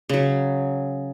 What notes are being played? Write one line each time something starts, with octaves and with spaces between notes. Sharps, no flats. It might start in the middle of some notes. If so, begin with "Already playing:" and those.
C#3 F#3